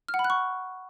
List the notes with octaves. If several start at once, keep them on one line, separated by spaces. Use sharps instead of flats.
F6
F#5
B5
F#6
C#6